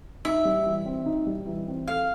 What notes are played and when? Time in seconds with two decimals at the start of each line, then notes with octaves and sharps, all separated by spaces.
0.25 D#4 E5
0.45 G3
0.66 E3
0.86 C4
1.06 D#4
1.27 G3
1.47 E3
1.68 C4
1.87 A4 F5